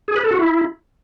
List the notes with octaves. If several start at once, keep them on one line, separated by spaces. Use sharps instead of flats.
G#4
B4
A4
F#4
E4